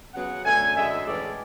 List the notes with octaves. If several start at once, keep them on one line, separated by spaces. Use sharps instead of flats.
C#3 F#3 B3 F#5
F#2 D3 A3 G#5
F#2 D3 G#3 E5
A2 E3 G#3 C#4 D5